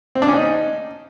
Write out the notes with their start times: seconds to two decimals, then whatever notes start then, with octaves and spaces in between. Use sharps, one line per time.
0.15 C4
0.22 D4
0.28 C#4
0.35 D#4